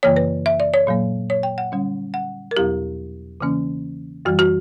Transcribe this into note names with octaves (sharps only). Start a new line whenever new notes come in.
F#2 C#3 E3 A#3 C#5
B4
E5
D5
C#5
A#2 F#3 A#3
C#5
G5
F#5
D3 G3 C#4
F#5
A#4
E2 B2 F#3 B3 E4 G4
C#3 E3 A#3 C#4
F#2 E3 G3 F#4
F#4